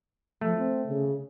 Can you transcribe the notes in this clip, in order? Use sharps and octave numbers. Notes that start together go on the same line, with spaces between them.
F3 A3
C4
C#3